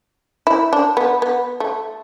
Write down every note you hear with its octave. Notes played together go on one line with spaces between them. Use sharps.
E4
D4
B3
B3
A3